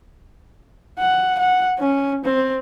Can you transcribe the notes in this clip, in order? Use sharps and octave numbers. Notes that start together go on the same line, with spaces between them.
F#5
F#5
C#4
C4